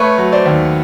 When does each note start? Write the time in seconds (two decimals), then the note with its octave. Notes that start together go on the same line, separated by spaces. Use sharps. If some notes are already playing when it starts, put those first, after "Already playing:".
Already playing: A3 B4 C#5
0.18 F#3
0.32 C5 D5
0.46 D#2